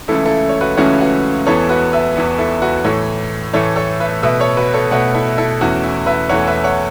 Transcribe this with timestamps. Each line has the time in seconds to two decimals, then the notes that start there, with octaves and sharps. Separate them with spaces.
0.08 C#2 C#3 E3 A3 E4 A4
0.26 E4 A4
0.49 C#5
0.61 F#4 B4
0.77 C#2 C#3 E3 A3 C#4 F#4
1.01 F#4 B4
1.46 E2 E3 B3 A4 C#5
1.69 F#4 B4
1.92 B4 E5
2.16 E2 E3 B3
2.38 E4 A4
2.62 F#4 B4
2.84 A2 E3 A3 A4 C#5
3.53 A2 E3 A3 A4 C#5
3.76 A4 C#5
4.00 B4 E5
4.23 B2 A3 B4 E5
4.40 A4 C#5
4.57 F#4 B4
4.74 A4 C#5
4.91 B2 A3 C#5 F#5
5.14 E4 A4
5.38 E4 A4
5.61 E2 E3 A3 C#4 F#4
5.84 E4
6.06 B4 E5
6.29 E2 E3 A3 C#5 F#5
6.47 B4 E5
6.64 C#5 F#5